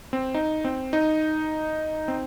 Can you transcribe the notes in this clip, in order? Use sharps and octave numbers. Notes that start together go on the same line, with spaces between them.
C4
D#4
C4
D#4
C4